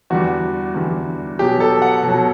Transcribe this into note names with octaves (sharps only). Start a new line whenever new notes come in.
E2 D3 G3 F#4
E2 D3 G3
B2 F#3 G4
A4
F#5
B2 F#3